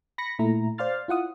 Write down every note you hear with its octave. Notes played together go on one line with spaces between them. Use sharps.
B5 A#6 C#7
A#2 A3 E4 A#5
C5 D5 F5 C6 F6 A6
E4 F4 F#5 D#6